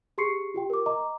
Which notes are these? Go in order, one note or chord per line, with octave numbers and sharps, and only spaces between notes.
G4 G#4 C6 C#6 C7 C#7
F4 G4 G5
A#4 D6
D#5 A#5 D6